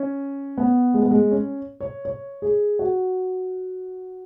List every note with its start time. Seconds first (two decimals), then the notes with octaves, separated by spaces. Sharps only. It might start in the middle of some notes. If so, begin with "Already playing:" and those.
Already playing: C#4
0.58 B3
0.94 G#3
1.02 B3
1.11 G#3
1.31 C#4
1.81 C#5
2.05 C#5
2.42 G#4
2.79 F#4